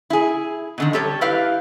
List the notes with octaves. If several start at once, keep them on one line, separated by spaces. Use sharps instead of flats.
E4 G#4
B2 D3 D#3
G3 G4 A4 C#5
E4 G4 B4 F5